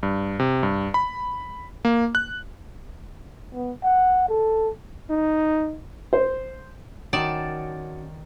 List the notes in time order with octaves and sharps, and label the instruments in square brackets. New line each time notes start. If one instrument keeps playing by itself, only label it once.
[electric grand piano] G2
C3
G2
B5
A#3
F#6
[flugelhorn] B3
F#5
A4
[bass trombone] D#4
[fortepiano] C5
[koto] D#3 D5 A5 [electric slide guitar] C#4 F#4